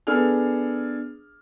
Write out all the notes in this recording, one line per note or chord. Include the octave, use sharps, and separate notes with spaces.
B3 D4 G#4 A4 F6